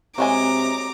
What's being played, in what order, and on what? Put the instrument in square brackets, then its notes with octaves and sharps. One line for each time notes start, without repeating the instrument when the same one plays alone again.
[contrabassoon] C3 [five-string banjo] F#3 G#3 G#5 [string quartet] A#5 D6